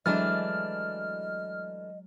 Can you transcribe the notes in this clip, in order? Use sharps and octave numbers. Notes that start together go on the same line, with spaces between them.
E3 F#3 G#3 A3 D4 D#5 F6 A6